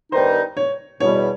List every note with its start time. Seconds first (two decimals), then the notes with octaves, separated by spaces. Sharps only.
0.12 G2 D#3 G3 B3 D#4 C5
0.57 C#5
1.00 E2 B2 G3 C#5